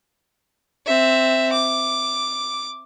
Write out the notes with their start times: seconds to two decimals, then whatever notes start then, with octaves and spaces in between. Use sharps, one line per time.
0.86 C4 E5
1.53 D6